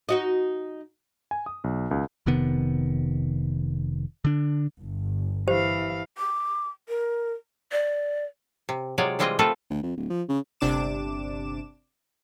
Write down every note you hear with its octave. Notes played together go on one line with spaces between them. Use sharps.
D#4 F#4 D#5
G#5
D#6
B1
C#2
F1 C3 D#3 B3
D3 D4
G1
E3 G4 C5 F5
D6
A#4
D5
C3
C3 F#3 G#3 F4 C#5 D5
E3 G3 G#3 C4 F4 D#5
A3 A#3 C4 F4 A4 B4
D2
F2
D1
F3
C#3
G1 C3 D4 D6 E7